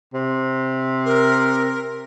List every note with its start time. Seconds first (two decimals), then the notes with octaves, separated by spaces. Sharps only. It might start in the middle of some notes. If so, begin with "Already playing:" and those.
0.14 C3
1.05 A#4